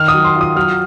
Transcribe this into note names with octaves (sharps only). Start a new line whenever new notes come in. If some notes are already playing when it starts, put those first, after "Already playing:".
Already playing: D#3 F6
D#6
F#3
C6
F4
D#6
F#3 F6